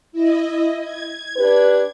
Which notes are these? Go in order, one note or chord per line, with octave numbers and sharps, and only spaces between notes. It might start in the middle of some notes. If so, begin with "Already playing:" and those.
E4 D#5
G#6
D4 G4 B4